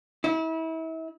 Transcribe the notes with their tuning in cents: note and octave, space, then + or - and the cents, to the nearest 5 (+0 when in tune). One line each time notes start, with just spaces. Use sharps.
E4 -35